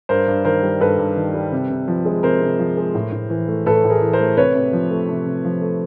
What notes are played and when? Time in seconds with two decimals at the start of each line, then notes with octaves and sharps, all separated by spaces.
0.09 G2 A#4 C5
0.28 G2
0.45 D#3 A#4 C5
0.63 G3
0.80 G2 A4 B4
0.98 G2
1.17 D#3
1.34 G3
1.52 C3
1.70 C3
1.88 F3
2.06 G#3
2.23 C3 A#4 C5
2.42 C3
2.59 F3
2.77 G#3
2.95 A2
3.12 A2
3.30 E3
3.48 A3
3.66 A2 A4 B4
3.84 A2
3.90 G#4 A#4
4.02 E3
4.13 A#4 C5
4.20 A3
4.37 C3 B4 C#5
4.55 C3
4.73 F3
4.91 A3
5.09 C3
5.26 C3
5.44 F3
5.62 A3